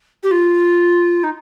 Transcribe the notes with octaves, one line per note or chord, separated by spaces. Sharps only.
G4
F4
D#4